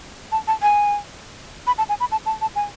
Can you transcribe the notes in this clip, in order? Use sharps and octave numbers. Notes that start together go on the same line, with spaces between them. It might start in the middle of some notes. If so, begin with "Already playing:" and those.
A5
A5
G#5
B5
A5
G#5
B5
A5
A5
A5
G#5